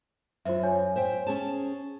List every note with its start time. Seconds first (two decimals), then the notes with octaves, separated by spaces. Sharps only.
0.45 F#2 F4 C5 E5
0.63 C#5 G#5
0.96 C5 E5 G5
1.27 C#4 G#4 A5